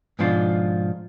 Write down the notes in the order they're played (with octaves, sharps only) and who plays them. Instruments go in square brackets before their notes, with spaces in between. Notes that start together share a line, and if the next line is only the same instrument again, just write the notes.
[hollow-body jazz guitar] G#2 B2 F3 D4 F4